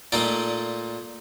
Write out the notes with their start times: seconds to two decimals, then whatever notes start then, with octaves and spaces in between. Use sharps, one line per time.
0.12 A#2 A3 D#4 D5